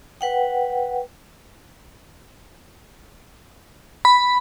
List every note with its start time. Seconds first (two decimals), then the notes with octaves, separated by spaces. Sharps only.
0.21 B4 F#5 G5
4.05 B5